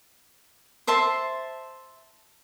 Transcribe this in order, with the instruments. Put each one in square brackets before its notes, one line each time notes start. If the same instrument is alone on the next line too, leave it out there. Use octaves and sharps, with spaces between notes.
[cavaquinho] C5 E5 A5 C6